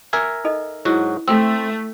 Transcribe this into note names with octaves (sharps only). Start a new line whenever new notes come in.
A#4 E5 G#5
D#4 A4 D#5
G#2 F#3 E4 F#4
A3 C4 A4 G5 E6